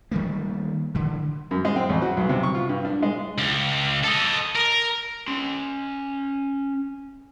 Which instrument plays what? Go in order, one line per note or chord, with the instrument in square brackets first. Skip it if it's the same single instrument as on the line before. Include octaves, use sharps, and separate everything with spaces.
[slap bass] D#3 G3 A3 A#3
D3 E3
[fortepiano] F#2
G#3
C4
A1
F#4
B1
C3
C#6
F4
G2
D4
G#3
[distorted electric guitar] C#2
A4 D#5
A#4
[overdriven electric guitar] C#4 C6